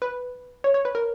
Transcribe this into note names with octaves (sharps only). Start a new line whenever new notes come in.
B4
C#5
C#5
B4
A#4